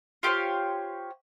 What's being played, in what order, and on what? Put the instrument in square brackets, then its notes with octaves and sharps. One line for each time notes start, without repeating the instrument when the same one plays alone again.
[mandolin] F4 G4 C5 C#5